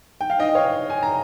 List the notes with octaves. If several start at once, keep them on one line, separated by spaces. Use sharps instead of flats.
G5
F5
D#5 G5
C#5 F5
G#5
A#5